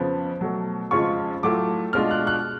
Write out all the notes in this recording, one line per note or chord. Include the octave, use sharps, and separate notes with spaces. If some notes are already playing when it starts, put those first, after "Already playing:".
Already playing: F2 C#3 F3 B3
B2 F#3 A3
F2 C#3 G#3 C#4 F4 C#6
A2 F#3 A3 F4 D6
B2 G#3 D4 F4 F6
F#6
F#6